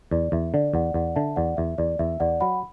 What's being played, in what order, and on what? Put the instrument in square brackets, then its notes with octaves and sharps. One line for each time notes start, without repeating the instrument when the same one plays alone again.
[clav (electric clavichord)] E2 [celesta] D5
[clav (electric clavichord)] E2 [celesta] E5
[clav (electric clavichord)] D3 [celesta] D5
[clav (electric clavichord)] E2 [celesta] D5 F#5
[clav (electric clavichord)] E2 [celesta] D5 F#5
[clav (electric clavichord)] D3 [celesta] E5 A5
[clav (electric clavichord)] E2 [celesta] D5 F#5
[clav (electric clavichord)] E2 [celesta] E5
[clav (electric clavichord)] E2 [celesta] D5
[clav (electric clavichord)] E2 [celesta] E5
[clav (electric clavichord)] E2 [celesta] D5 F#5
[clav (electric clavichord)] F#3 [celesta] F#5 B5